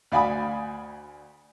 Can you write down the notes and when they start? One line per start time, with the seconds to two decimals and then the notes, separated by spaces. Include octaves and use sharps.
0.12 D2 D5 F5 G#5 B5 D#6